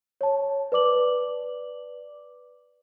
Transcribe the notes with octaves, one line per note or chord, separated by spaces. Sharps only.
C#5 A5
B4 D5 D6 F#7